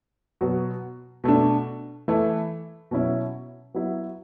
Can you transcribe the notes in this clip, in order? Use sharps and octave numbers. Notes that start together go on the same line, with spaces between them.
B2 F#3 B3 F#4
B2 A3 D4
E3 A3 E4
B2 F#3 C#4 E4
F#3 B3 E4